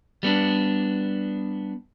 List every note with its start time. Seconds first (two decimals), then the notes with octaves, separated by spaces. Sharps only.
0.23 G3 B3 D4